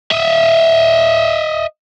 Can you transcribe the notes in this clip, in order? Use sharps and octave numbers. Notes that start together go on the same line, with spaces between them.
D#5 E5